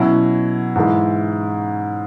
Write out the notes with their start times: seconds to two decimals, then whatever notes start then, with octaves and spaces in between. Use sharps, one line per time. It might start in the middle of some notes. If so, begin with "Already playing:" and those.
Already playing: B2 F#3 C#4 E4
0.76 G#2 E3 G#3